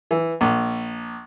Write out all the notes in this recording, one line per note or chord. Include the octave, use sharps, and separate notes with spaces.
E3
A#1